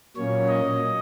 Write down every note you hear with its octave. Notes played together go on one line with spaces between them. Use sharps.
A#2 F#3 A#3 C#4 C#5
D#5